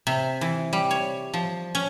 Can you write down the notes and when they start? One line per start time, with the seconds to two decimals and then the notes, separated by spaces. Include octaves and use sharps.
0.07 C3
0.41 E3
0.73 G3
0.91 C#5
1.33 F3
1.75 C#4